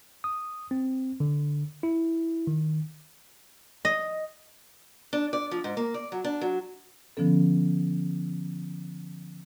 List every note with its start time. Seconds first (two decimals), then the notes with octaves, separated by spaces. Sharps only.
0.24 D#6
0.71 C4
1.20 D3
1.83 E4
2.47 D#3
3.85 D#5
5.13 D4
5.33 D5
5.51 F3
5.64 G#2
5.77 A#3
5.94 D5
6.12 F#3
6.24 D4
6.41 F#3
7.17 D3 F3 B3 C#4 A4